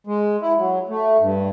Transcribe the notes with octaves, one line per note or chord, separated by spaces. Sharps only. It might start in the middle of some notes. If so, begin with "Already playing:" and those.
G#3
E4
F#3
A3
G2